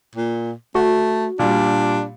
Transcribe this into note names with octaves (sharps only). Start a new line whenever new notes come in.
A#2
A3 F#4
A#2 G3 D4